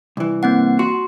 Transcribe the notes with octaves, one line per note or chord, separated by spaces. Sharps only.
C2 E3
A#3 C4 F#5
F#4 C6